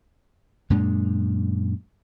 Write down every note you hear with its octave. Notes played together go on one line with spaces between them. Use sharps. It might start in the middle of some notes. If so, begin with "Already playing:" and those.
F#2 A#2 G#3 D4